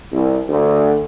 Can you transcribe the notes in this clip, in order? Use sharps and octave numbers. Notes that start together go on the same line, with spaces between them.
C2
D2